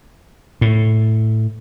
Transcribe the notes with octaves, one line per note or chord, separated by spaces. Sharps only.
A2